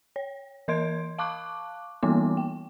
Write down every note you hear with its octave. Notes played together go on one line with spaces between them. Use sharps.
C#5
E3 A#4 D#5 C6 G#6 D7
F5 A5 C#6 D6 F#6
E3 G3 A#3 B3 D#4 D6
G5